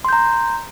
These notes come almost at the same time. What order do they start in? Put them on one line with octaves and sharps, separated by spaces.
C6 G6 A#5